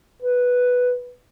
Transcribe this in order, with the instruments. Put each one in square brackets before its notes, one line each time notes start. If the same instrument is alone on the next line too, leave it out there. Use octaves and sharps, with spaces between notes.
[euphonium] B4